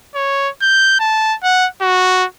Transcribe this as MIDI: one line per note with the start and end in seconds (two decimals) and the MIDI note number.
0.15 0.49 73
0.62 0.97 91
1.00 1.35 81
1.44 1.67 78
1.82 2.25 66